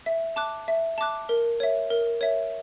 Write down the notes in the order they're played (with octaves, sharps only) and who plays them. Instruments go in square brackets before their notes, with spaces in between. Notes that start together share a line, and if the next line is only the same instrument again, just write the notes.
[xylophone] E5
A5 D6 F#6
E5
A5 D6 F#6
A#4
C#5 E5
A#4
C#5 E5